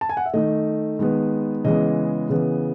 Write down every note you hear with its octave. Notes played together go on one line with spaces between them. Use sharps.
A5
G#5
F#5
E5
D#3 A3 D#5
D#3 G#3 B3
C#3 E3 G#3 B3 D#5
C#3 E3 B3